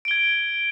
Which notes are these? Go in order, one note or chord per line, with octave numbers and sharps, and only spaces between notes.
G#6 D7 G7